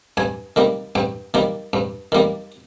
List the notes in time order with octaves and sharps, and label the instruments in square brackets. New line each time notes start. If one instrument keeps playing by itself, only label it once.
[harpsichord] G2 G#5
D#3 G3 A#3
G2 G5
D#3 G3 A#3
G2
D#3 G3 A#3